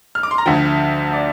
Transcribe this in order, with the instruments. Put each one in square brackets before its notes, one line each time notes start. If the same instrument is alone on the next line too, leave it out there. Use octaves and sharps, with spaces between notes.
[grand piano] F6
D6
C6
A#5
D2 D3 F3 G5
D5